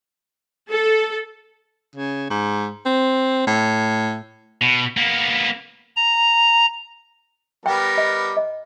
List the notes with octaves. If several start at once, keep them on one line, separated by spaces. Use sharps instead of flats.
A4
C#3
G#2
C4
A2
B2
A#3 B3
A#5
G3 B3 A#4 G5
D#5
D#5